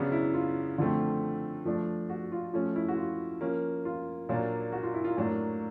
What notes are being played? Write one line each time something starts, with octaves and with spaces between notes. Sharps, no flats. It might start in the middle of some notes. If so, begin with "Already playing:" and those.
Already playing: C#3 F#3 B3 D4
E4
F4
D3 F3 A3 C4
F3 A3 D4
F#4
F4
F3 A3 C#4
E4
F#4
F4
F3 A#3 C#4
F4
A#2 F#3 A#3 D4
F#4
F4
E4
F4
A2 F#3 A#3 D4